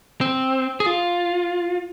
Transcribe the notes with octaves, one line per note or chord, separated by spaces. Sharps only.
C4
G#4
F4